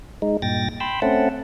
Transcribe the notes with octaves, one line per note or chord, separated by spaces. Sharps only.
G#3 D#4
G2 A#2 G5 A6 A#6
G5 B5 C6 E6
A3 C4 C#4 E5 F#5 A5